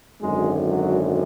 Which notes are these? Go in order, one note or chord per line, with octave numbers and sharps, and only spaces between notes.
G#1 F#2 D3 G#3
F#3